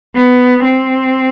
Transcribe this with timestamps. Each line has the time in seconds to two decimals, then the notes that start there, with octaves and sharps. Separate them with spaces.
0.15 B3
0.64 C4